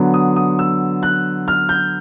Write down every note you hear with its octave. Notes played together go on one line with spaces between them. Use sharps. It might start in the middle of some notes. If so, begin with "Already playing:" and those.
Already playing: D3 F#3 B3
D#6
D#6
E6
F#6
F6
G6